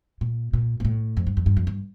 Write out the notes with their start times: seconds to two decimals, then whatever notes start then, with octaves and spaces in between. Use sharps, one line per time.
0.21 A#2
0.53 A#2
0.80 A#2
0.85 A2
1.17 F2
1.27 G2
1.37 F2
1.46 G2
1.57 F2
1.67 G2